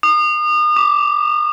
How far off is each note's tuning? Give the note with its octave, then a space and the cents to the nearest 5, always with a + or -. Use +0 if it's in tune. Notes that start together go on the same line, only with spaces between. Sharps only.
D#6 -35
D6 -5